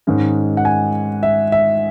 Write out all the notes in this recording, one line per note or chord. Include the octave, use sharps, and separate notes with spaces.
G#2 D#3 G#3 C#4
F#5
G#5
E5
E5